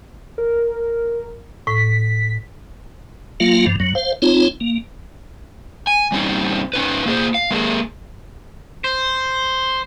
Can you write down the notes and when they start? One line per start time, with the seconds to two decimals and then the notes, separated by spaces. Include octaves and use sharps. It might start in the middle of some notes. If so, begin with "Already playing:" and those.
0.38 A#4
1.67 A2 B6
3.40 F#3 A#3 F4 F5
3.66 G2 F3
3.80 F#2 F#3
3.95 C5 F5
4.22 C4 D#4 F4 C#5
4.61 A#3
5.87 G#5
6.12 G3 C4 C#4 D#4
6.73 C#4 D#4 B4
7.06 A#3 G#4 A#4 C5
7.34 F5
7.51 G#3 A#3 G#4
8.85 C5